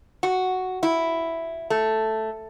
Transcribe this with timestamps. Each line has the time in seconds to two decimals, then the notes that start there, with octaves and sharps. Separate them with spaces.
0.23 F#4
0.83 E4
1.70 A3